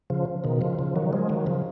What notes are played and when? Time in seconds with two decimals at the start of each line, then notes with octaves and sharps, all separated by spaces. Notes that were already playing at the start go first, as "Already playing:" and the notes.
0.10 C#3 F3
0.44 B2 D#3
0.61 C#3 F3
0.79 C#3 F3
0.96 D#3 F#3
1.13 F3 G#3
1.29 D#3 F#3
1.46 C#3 F3